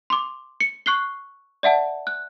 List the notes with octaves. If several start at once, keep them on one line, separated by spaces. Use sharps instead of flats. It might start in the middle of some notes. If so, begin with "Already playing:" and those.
C6 D6
C#7
C#6 F#6 C7 G7
D5 E5 F#5 A5
F#6